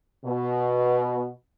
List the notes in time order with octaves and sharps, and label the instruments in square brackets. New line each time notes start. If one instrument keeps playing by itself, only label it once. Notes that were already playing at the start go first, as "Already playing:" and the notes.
[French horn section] B2